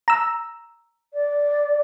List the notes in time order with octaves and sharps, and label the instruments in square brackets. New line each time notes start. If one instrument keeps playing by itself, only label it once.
[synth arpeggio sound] A#5 E6
[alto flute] D5